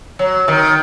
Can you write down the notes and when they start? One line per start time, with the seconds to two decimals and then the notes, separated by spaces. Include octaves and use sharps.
0.19 F#3
0.48 D#3